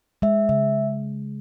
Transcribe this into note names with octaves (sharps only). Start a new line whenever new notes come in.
G#3 E5
C#3 E5